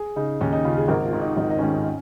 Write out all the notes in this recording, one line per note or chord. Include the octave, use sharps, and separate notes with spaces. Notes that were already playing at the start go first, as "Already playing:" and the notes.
Already playing: G#4
C#3 D#4
D#2 C#4
D#4
C#3 F4
G#4
G#1 A#4
F4
G#2 D#3
D#4
G#1 D#4
D#5
C#4
G#2 D#3 D#4
C#4